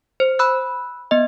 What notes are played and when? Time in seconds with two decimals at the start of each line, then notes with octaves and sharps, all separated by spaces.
0.20 C5
0.39 B5 E6 F#6
1.11 B3 D#5